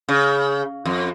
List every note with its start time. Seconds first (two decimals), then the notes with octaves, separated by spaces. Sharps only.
0.09 C#3
0.85 F2